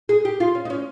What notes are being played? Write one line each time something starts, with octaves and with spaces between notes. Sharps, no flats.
G#4
G4
F4
C#4
D#4
C#4